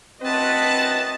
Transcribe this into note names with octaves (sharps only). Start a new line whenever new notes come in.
F#2 C4 F#4 B4 D#5 A5